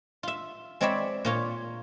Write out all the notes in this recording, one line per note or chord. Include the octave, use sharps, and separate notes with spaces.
F4 E5
G#3 C4 C#5 D5 E5 B5
A#2 F4 C#5